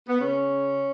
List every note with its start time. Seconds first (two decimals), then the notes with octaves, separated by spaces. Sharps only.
0.08 B3
0.19 C#3 C#4